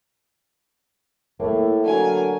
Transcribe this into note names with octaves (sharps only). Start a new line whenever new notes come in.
A2 A3 A#3 E4
D3 F#3 A#4 G#5